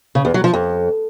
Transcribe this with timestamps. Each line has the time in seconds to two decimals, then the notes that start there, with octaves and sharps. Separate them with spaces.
0.15 C#3
0.25 E2
0.34 F#3
0.44 F3
0.54 F2